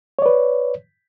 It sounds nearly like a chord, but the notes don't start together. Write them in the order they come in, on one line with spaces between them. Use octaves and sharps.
C#5 D5 B4